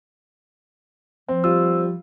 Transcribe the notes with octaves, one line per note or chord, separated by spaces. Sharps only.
F3 C4
G3 F4 E6